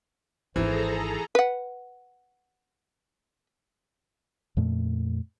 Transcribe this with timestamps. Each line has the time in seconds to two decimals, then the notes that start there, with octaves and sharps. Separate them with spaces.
0.56 G#1 E3 D#4 G#4 A4 C5 A#5
1.35 B4 F#5
4.57 F2 A#2 A3